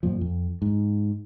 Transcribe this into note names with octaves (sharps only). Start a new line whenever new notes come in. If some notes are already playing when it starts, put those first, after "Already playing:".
F#2 A#2 F3
F2
G#2